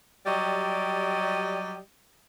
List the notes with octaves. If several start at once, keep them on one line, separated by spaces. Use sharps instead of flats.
F#3 G3 G4 D5 D#5